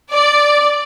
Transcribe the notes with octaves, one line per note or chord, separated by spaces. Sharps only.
D5